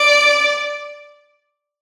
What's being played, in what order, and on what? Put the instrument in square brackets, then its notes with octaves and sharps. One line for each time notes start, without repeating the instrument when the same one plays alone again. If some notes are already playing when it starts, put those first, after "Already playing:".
Already playing: [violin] D5